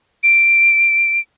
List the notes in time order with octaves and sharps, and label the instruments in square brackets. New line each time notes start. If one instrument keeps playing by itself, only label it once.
[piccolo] D7